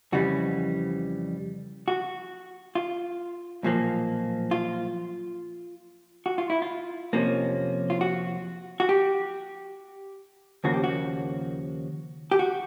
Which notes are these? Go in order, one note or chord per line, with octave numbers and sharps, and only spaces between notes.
F2 C#3 E3 G3 F#4
F#4
F4
B1 A#2 F3 A#3
F4
F#4
F4
E4
F4
F2 C3 F3 A#3 C#4
F4
F#4
F#4
G4
D#2 C#3 F3 A#3 F#4
G4
F#4
G4
F#4